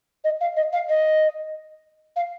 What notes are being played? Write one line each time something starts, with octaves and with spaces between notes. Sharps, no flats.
D#5
F5
D#5
F5
D#5
F5